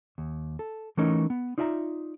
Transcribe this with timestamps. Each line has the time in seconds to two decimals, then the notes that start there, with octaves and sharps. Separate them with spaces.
0.18 D#2
0.59 A4
0.97 E3 A3 C#4 D#4 A#4 C#5
1.30 B3
1.58 D#4 F4 D5 E5 G5 A#5